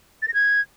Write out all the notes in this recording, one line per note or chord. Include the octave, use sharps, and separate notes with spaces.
A6
A#6
G#6